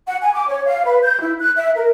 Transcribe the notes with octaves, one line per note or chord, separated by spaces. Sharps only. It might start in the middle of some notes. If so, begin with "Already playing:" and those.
F#5
G#5
D6
C#5
F5
B4
G6
E4
F#6
E5
A#4